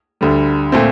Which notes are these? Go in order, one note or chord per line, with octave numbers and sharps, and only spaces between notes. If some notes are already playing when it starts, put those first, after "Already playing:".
D2 D3 G3
A#2 A3 C4